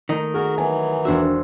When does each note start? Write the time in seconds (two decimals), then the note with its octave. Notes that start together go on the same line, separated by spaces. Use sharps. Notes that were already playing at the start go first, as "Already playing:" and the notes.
0.09 D#3 A3 D#5 A#5
0.34 F#4 G#4 A#4
0.58 E3 F#3 G#5
1.05 E1 D4 F#4 C5 E5